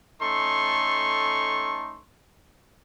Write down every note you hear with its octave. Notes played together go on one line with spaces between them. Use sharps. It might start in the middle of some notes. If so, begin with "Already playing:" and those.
A3 C#4 D#4 A4 C6 C#6